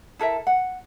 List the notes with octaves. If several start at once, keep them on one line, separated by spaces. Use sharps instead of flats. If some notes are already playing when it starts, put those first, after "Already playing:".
E4 A4 A#4 E5
F#5